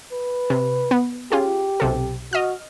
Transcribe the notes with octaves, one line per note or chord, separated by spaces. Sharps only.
B4
C3
B3
C#4 F4 G4 G#4
B1 C3 A4
F#4 D#5 F6